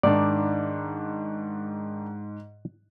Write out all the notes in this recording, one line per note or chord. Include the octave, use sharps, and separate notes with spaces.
G#2 D#3 D4 D5